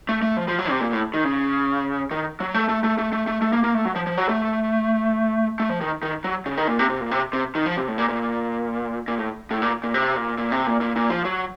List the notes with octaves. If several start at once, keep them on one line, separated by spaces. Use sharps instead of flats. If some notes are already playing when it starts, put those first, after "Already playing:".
A3
A3
F3
F3
F#3
C3
A#2
A2
D#3
C#3
D#3
F#3
A3
A3
A3
A3
A3
A3
A3
A#3
A#3
A3
F#3
F3
F3
F#3
A3
A3
F3
D#3
D#3
F#3
C#3
D#3
A#2
C3
C3
A#2
C3
C3
D#3
F3
C3
A2
A#2
A#2
A#2
A2
A2
A#2
A#2
C3
A#2
A#2
C3
A#2
A#2
A#2
F3
F#3